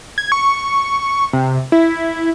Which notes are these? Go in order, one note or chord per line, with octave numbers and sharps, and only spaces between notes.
G#6
C#6
C3
E4